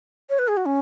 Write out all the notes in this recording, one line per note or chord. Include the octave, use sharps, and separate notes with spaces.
C#5
B4
G#4
F#4
C#4